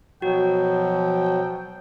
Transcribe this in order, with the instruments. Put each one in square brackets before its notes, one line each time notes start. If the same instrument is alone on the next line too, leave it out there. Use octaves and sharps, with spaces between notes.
[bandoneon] B2 F#3 [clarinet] F3 [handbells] F#4 [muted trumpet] G5